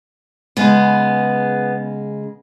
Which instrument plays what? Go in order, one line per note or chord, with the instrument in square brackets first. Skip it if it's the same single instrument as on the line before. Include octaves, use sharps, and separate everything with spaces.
[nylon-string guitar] C#3 G#3 [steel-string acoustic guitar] B3